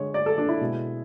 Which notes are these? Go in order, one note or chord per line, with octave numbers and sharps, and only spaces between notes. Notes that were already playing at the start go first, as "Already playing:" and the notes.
Already playing: D3 G#3 C#5
D5
A4
D4
E4
B2 G#3